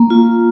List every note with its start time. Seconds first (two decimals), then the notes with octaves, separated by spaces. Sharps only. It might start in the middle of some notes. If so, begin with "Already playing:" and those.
Already playing: A#3
0.10 F4